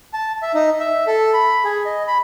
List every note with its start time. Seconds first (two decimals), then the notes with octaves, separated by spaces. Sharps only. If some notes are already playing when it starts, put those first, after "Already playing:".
0.14 A5
0.42 E5
0.54 D#4
0.80 E5
1.07 A4
1.34 B5
1.65 G#4
1.85 D#5
2.08 B5